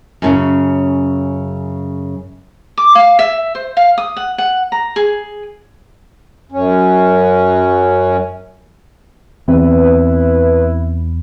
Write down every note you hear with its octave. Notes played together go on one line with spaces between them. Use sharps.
F#2 A2 C#3
D6
F5
E5
C5
F5
D#6
F#5
F#5
A#5
G#4
F#2 C#4
E2 C4 E4 B4